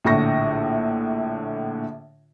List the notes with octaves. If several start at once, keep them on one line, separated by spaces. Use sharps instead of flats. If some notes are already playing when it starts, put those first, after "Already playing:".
A#1 A2 D3 C#6 A#6